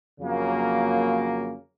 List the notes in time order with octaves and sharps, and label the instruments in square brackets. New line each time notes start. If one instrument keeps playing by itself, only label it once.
[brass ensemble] F2 C#3 F#3 A#3